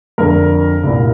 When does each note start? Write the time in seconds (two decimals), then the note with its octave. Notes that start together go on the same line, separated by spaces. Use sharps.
0.18 F2 D3 A#4
0.84 C2 A#2